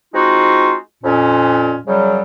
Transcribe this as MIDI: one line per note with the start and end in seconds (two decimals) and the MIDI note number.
0.13 0.75 56
0.13 0.75 60
0.13 0.75 63
0.13 0.75 65
0.13 0.75 66
1.03 1.76 41
1.03 1.76 46
1.03 1.76 61
1.87 2.23 42
1.87 2.23 49
1.87 2.23 54
1.87 2.23 55